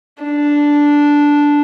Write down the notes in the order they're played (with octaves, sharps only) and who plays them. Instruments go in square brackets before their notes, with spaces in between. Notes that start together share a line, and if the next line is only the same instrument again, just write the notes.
[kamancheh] D4